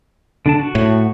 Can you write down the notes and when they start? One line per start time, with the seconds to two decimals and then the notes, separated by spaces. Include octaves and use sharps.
0.46 D3 D4 A5
0.59 F#4
0.75 A2